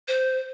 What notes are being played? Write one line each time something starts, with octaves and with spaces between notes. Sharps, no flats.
C5